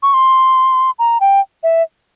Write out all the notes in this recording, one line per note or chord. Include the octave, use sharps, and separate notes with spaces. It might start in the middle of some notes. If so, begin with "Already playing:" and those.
C#6
C6
A#5
G5
E5